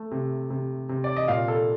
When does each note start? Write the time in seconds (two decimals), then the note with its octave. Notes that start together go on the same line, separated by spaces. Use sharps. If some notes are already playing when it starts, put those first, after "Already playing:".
Already playing: A3
0.11 C3
0.50 C3
0.89 C3
1.04 D5
1.16 D#5
1.28 A#2 F5
1.48 A4